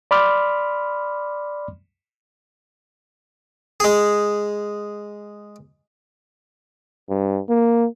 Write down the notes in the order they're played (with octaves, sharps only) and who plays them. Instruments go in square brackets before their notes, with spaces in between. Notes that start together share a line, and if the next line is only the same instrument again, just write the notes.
[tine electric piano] D5 B5 C6 D6 F6
[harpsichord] G#3 G#4
[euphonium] G2
A#3